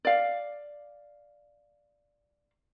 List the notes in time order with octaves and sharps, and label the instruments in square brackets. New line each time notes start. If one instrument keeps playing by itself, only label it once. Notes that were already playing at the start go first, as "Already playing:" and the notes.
[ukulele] D5 F5